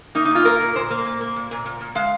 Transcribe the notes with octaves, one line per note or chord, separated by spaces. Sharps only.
A#3 D#4
D#4
A#2 F4
A#3 A#4
A#2
A#2 C5
A#3
A#2
A#3
A#2
A#2
A#2
A#2
G#3 F5